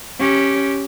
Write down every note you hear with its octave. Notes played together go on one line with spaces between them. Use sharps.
C#4 G4